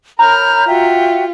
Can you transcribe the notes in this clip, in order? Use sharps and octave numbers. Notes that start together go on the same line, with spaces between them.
A#4 C#5 A#5 B5 F6 G6
F4 F#4 E5 G5